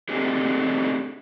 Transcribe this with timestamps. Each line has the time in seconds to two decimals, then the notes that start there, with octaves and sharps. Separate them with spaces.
0.09 A3 C4 D4 D#4 G4 G#4